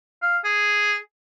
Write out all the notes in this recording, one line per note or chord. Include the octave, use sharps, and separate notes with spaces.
F5
G#4